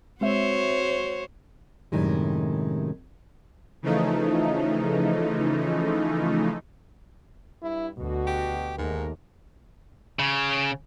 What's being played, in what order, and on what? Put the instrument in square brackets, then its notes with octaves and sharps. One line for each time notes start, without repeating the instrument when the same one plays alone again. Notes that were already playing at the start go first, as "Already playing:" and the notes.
[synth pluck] G#3 C4 E5 [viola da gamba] F#4 C5 C#5
[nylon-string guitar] F#2 A2 C3 D#3 G3 G#3
[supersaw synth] C#3 E3 F3 A3 D#4
[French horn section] G2 [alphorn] E4
[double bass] D2 [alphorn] B2 [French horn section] F#4
[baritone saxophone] G4
[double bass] D#2 [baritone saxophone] G#2 [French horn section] A3 A#4
[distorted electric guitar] C#3